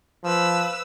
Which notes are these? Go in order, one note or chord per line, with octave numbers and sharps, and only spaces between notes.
F3 B4 E6